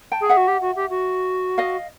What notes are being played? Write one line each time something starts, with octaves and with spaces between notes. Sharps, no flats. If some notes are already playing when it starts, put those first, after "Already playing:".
G5 A5
G#4
E5 F#5
F#4
G4
F#4
G4
F#4
D#5 F5